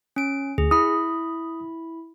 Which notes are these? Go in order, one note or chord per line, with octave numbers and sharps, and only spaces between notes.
C#4 D7
D2 G#4
E4 B5 D#6